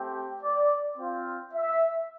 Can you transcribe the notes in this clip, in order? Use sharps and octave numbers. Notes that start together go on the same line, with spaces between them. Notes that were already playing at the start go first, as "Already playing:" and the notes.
Already playing: A3 C4 G4
D5
C4 F4
E5